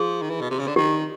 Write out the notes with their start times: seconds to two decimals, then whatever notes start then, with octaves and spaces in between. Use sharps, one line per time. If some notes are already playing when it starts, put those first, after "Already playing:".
Already playing: F3 G#4
0.22 D#3
0.30 E3
0.41 B2
0.50 C3
0.59 C#3
0.68 D3
0.76 D#3 G4